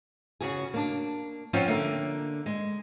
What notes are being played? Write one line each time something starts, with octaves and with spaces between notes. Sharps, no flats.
C#3 F#4 G#4
A#3 D4
F3 C4 C#4 F4 C#5 F#5
D3 A#3 E5
G#3